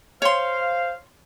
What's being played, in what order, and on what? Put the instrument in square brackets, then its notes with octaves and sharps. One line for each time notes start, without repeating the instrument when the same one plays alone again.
[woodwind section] C5 F5 [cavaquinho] C#5 C6